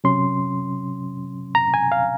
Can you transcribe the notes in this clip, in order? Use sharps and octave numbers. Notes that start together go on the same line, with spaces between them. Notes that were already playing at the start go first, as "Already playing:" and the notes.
C3 F#3 C#4 C6
A#5
G#5
F5